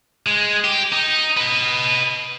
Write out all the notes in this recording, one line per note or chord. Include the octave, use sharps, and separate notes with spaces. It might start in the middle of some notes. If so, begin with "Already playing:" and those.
G#3
G4
D#4
B4 D#5